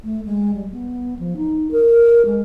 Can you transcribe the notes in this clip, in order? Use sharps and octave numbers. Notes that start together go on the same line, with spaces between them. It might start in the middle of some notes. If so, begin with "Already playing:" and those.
A3
G#3
G3
B3
F3
D#4
A#4
G#3